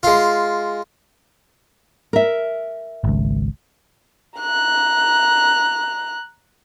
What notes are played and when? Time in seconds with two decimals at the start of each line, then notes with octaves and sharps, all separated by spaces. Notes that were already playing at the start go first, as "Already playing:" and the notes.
0.03 G#3 F4
2.13 A#4 E5
3.04 G#1 C#2
4.40 A#5 F#6